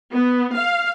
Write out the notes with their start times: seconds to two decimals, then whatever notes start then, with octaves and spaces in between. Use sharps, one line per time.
0.13 B3
0.57 F5